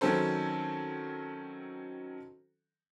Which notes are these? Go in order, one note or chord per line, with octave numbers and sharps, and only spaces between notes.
D#3 F#3 C4 C#4 A4 C5